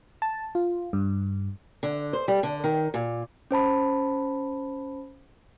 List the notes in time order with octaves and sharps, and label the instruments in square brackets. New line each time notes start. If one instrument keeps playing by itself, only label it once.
[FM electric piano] A5
F4
G2
[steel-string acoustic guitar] D3
C5
G3
D3
D#3
A#2
[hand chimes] C#4 C5 A5 B5